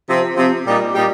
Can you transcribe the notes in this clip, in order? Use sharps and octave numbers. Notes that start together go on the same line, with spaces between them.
C3 F3 C4
C3 F3 C4
A#2 G3 D#4 G4
A#2 G3 D#4 G4